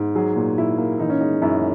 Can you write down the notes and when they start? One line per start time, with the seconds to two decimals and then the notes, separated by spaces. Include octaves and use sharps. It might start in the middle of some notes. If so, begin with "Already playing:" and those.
Already playing: G#2
0.15 F#3 G#4
0.36 A#2
0.58 A#2 E4
0.78 A#3
1.00 E3 D#4
1.10 C#4
1.20 G#3 D#4
1.42 F#2 E4